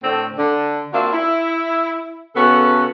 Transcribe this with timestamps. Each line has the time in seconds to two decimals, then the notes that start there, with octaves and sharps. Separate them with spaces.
0.03 A2 D3 C4
0.37 D3 D4
0.93 A#3 C4 D4 F4 F#4 E5
1.13 E4
2.35 C#3 B3 C#4 F#4 A4